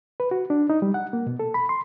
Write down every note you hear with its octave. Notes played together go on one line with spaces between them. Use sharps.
B4
F#4
D4
D#4
G3
F#5
A#3
B2
A4
B5
C6